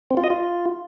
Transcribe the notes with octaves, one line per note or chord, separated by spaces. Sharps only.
C4
F4
D#5
F4